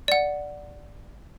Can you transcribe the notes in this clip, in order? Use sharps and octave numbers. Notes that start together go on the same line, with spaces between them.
D5 F#5